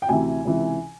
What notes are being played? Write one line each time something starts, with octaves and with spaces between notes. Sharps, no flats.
G5
D2 C3 E3 G#5
C#2 C3 E3